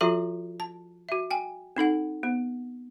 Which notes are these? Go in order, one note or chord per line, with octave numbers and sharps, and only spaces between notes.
F3 F4 F#4 A4 E5 A#5
A5
F#4 E5
G5 G#5
C4 D#4 A4 F#5
B3